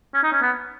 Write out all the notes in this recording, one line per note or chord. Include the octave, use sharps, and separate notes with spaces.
C#4
D#4
C#4
B3